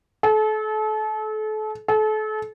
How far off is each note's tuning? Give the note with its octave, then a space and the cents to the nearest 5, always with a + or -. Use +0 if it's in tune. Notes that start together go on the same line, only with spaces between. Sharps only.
A4 -35
A4 -35